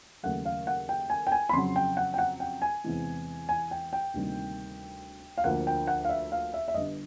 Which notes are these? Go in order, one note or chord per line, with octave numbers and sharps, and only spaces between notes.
D#2 C#3 F#3 A3 F#5
F5
F#5
G5
G#5
G5
G#5
B5
F2 C#3 F#3 C6
G5
F#5
G5
F#5
G5
G#5
E2 C3 E3 G#3
G#5
G5
G5
D2 C3 D#3 G3 A#3
F5
D2 D3 F3 A#3 F#5
G5
F#5
F5
E5
F5
E5
E5
G1 G2 D3 D#5